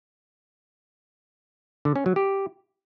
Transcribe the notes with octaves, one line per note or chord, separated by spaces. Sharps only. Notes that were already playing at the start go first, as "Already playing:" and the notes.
D3
C#4
F#3
G4